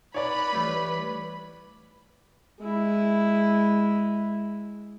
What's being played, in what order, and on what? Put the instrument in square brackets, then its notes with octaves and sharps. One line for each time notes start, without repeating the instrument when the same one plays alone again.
[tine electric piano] D#4 [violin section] B4 B5 [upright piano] C#5 D5
[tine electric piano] E3 G3 A3
[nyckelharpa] G#3 E4